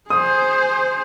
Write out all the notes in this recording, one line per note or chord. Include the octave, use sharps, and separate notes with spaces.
G#4 C5 D#6